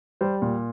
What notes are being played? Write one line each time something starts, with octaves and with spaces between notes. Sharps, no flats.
G3 C5
A#2